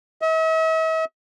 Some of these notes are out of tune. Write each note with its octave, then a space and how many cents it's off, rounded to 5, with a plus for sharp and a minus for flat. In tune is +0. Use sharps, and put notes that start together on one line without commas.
E5 -45